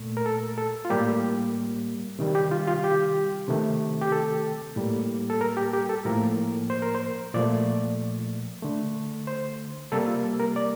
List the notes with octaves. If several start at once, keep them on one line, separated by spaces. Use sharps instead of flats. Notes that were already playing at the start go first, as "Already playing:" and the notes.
Already playing: A#2 A3
A#4
A4
A4
F4
A2 G3 A#3 G4
C3 D#3 G3
G4
F4
F4
G4
C3 D#3 A3
G4
A4
A2 G3 A#3
A4
A#4
G4
G4
A4
A2 F3 A#3 A#4
C5
A#4
C5
A#2 F3 A3 D5
D3 A3
C5
C3 G3 A#3 A4
F4
A#4
D5